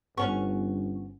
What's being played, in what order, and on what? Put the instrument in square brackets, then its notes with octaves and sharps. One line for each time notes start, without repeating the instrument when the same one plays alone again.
[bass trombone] G1 [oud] B3 C#4 [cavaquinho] C#6